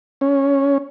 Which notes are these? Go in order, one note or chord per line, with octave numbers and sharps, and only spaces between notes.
C#4